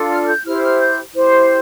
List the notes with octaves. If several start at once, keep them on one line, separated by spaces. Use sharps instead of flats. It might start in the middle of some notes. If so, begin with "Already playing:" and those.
Already playing: D4 F4 A4
F6
F6
G6
E4 G4 C5 F6
F6
G6
E4 G4 C5